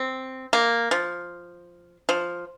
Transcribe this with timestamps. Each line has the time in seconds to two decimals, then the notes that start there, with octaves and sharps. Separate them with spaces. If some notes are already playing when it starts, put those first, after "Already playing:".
Already playing: C4
0.53 A#3
0.91 F3
2.09 F3